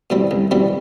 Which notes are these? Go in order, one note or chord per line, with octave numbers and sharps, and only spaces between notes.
B2 G3 C4 E4
C2
B2 G3 C4 E4